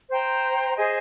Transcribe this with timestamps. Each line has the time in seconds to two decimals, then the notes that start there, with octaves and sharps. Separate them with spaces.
0.09 C5 G5 A#5
0.77 G#4 C5 D#5 G#5